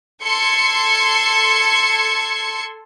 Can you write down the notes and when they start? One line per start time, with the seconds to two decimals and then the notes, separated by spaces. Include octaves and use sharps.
0.23 A4 C6 G#6 C#7